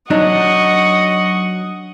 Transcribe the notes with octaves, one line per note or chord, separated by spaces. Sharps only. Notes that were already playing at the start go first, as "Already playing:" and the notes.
F#3 D4 D#4 D#5 F#5 C#6